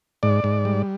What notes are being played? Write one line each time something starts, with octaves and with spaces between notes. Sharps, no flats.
G#2 D5
G#2
G3